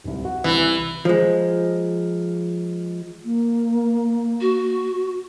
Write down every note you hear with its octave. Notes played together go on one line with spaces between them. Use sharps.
D1 C2
F#4
C2 E3
F3 G#3
A#3
F#4